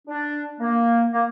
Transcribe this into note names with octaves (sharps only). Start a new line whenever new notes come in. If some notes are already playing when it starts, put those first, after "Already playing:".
D4
A#3
A#3